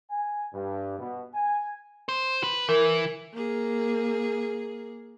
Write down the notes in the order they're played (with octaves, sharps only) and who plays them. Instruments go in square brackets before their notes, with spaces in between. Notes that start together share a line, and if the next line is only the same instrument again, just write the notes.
[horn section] G#5
G2
B2
G#5
[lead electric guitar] C5
B4
[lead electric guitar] E3 [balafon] A#4
[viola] A#3 G#4